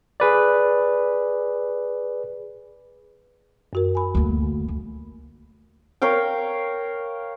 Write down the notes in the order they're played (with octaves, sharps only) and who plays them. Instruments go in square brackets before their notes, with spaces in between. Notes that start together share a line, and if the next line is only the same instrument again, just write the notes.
[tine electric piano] G#4 B4 D5
[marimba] F#2 F#4 A#4
G#5 B5
[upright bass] D2 A#3
D2
[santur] A#4 C#5 F5 G5